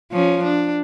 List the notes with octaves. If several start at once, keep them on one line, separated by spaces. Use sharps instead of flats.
F3 C#4
D4